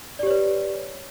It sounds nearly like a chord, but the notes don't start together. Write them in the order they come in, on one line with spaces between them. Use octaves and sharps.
D5 G4 C#5 B4